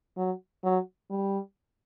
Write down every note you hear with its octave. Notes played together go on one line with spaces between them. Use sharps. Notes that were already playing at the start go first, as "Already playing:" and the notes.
F#3
F#3
G3